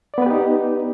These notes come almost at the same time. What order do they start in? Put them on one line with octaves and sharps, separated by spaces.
D5 B3 B4 G4 D#4